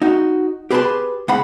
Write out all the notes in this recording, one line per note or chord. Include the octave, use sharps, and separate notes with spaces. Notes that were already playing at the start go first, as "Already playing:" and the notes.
D#4 F#4
G4 G#4 B4 C5 A5 C6
C#2 F5 F#5 B5